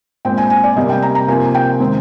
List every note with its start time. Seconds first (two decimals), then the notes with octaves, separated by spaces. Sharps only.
0.25 A#2 G#3 C4 G5
0.38 G#5
0.50 G#5
0.64 D5
0.76 C3 G3 A#3 D#5
0.89 G5
1.02 A#5
1.15 A#5
1.28 C3 F3 A#3 G#5
1.54 G5
1.80 D#3 G#3 C4